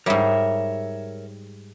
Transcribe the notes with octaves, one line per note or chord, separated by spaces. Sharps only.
G#2 G3 A#4 C#5 E5